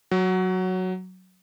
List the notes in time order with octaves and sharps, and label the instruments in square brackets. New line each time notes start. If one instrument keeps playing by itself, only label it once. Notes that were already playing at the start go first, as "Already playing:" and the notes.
[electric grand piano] F#3